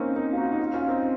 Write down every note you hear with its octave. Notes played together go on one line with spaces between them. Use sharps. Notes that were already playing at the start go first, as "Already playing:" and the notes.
Already playing: A#3 C4 C#4 D#4
C4 D#4
F4
D#4 F#4
D#4
C#4 F4
C#4 F4
C4 D#4